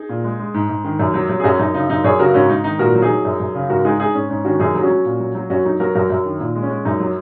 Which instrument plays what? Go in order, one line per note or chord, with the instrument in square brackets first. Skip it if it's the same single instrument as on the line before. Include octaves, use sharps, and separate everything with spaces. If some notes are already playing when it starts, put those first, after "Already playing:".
Already playing: [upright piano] D#4 G#4
A#2
G#3
G#3
G#2
G#2
D#3
F#2
F#3
F#3
G#4
F#2 C#4 F#4
F#2 D#4
C#3 D#4
F#2 D#4
F#2 G#4 C#5
C#3 F#4 A#4
G#2 C#4 F#4
G#2 D#4
D#3 D#4
A#2 F#4 A#4
F#3
D#4 G#4
F#3
F#2
F#2
C#3
G#2 F#4 A#4
G#3 D#4 G#4
G#3 D#4 G#4
G#2 C#4
G#2 C#4
D#3 C#4 F#4
F#2 D#4 G#4
F#3
C#4 F#4
F#3
A#2
F#3
F#3
F#2 C#4 F#4
F#3 D#4
F#3 F#4 A#4
F#2 F#4 A#4
F#2
D#3
A#2
G#3
C#4
G#3
F#2 D#4
F#3